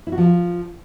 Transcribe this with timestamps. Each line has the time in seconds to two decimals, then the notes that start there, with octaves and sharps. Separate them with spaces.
0.07 E4
0.12 F#4
0.18 F3